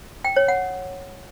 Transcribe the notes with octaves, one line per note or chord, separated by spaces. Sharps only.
G5
C#5
F#5